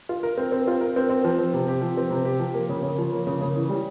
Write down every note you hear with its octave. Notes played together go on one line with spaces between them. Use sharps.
F4
A#4
C4
C4
F4
A#4
C4
C4
F3
C4
C3
G4
F3
C4
C3
G4
F3
A#3
C#3
C#3
F3
A#3
C#3
C#3
E3
G3